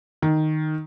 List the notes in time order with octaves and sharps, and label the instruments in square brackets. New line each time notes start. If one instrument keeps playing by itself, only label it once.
[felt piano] D#3